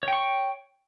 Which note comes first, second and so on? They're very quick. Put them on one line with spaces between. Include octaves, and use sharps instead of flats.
C#5 G5 C#6